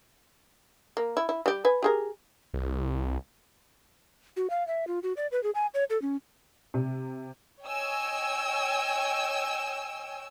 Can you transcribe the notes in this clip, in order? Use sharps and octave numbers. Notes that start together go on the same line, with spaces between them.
A#3
E4
E4
G3 G4
B4 G#5
G4 G#4 A#4
C2
F#4
F5
E5
F4
F#4
D5
B4
G#4
G#5
C#5
A4
C#4
C3
C#5 D#5 G5 G#5 E6